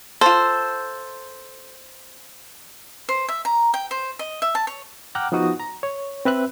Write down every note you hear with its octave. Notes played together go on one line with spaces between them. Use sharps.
F4 A4 C5
C5
E5
A#5
G5
C5
D#5
E5
A5
C#5
F#5 G5 A#5 D6 F6 F#6
F3 B3 D#4 F#4 D#6
A#5
C#5
C4 B4 E5 F#6